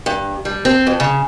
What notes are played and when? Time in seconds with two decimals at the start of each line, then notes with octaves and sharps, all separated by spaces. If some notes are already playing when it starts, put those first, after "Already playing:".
0.06 G2
0.45 G3
0.65 C4
0.87 F2
1.00 C#3